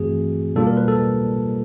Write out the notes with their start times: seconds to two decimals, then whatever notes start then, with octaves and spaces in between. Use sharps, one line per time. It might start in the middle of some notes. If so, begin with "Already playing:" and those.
Already playing: G2 E3 A3 C4 F#4 G#4
0.56 B2 G3 A#3 D4 F4 A4
0.67 A#4
0.77 B4
0.88 A4